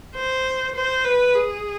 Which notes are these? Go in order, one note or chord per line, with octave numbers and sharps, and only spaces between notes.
C5
C5
B4
G#4